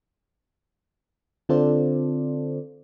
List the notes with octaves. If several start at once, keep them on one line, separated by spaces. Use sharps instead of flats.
D3 C4 F4 A4 C5 D5